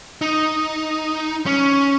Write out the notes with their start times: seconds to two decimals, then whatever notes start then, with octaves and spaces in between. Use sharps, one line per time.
0.21 D#4
1.46 C#4